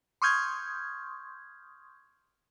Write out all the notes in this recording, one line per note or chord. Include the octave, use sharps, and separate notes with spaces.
C6 C#6 D#6 F6 G6 G#6